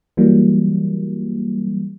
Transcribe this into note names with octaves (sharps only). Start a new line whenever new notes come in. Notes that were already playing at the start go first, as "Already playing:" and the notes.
E3 F#3 G3 A#3